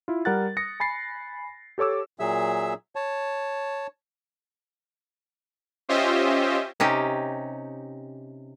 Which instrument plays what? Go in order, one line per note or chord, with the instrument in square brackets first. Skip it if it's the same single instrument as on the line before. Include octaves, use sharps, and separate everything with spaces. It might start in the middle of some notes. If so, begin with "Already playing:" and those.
[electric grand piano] E4 F4
G3 A#4 F#5 F#6 A6
D#6 A#6 C#7
G#5 B5 A6 C7
G4 A4 C#5 D6 E6
[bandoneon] A#2 F#3 G#4 E5 E6
C#5 A5
[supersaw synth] C#4 F4 G4 C5 D#5 E5
[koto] C3 C#4 D#4 G4